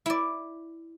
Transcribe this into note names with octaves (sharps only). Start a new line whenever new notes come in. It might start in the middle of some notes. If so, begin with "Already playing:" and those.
E4 D5